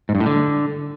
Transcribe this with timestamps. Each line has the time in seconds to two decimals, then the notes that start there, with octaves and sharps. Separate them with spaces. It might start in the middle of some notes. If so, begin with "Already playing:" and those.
0.09 G#2
0.15 G2
0.20 A2
0.26 D3